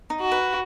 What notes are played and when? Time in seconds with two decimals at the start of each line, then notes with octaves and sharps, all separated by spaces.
0.10 D#4
0.20 F#4
0.32 B4